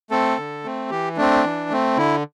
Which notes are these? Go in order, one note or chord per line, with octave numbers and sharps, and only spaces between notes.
A3 C4 A4
D3
A3 C4
E3 G4
A3 C4 D4
E3
A3 C4
D3 E4